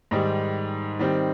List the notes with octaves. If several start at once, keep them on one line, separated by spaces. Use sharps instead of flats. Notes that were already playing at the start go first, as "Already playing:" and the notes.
G#2 D#3 G3
D#3 G3 C4